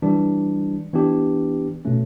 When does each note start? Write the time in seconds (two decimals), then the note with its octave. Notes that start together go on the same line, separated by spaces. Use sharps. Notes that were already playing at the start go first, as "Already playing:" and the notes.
0.02 E3 G3 D4
0.93 E3 B3 D4 G4
1.85 B2 A3 C#4